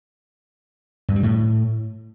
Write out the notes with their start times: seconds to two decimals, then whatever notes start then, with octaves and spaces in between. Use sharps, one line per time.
1.09 G2
1.16 G3
1.23 A2